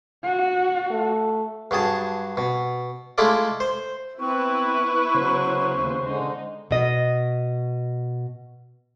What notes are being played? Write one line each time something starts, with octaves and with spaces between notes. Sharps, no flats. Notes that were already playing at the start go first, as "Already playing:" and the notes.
F#4
A3
G2 F#3 G#4 A5
B2
G#3 A3 E4 F4 A4 D5
C5
B3 C4 E4 B4 C#6
C#3 F#3 C5
D#2
D3 G#3 D#4
B2 D#5